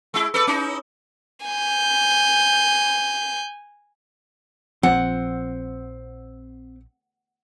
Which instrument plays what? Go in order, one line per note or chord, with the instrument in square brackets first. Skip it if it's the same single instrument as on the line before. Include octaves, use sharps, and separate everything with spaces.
[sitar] G#3 E4
A4 B4 D5
C#4 D#4 E4
[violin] G#5 G6
[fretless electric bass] A#1 F3 [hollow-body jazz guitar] C4 [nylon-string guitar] F#5